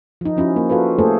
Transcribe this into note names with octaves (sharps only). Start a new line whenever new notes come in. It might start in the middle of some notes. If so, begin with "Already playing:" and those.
F3 D#4
F3 C#4 E4 F#4
A#3
F4 F#4 A4 B4
A3 A#3 E4 G#4 A4 C5